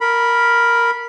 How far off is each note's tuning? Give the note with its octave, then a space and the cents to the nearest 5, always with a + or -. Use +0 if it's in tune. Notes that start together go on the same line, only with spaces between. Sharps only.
A#4 +0 B5 -15